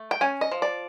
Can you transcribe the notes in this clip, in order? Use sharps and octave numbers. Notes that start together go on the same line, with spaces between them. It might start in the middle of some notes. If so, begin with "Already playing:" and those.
Already playing: A3
G5
C#4 G#5
D#5
F3
D5